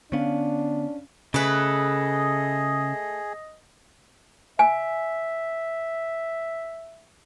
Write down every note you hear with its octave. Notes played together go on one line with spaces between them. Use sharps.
D3 B3 C#4 D4 F5
C#3 A3 G#4 B4 D#5
E5 G#5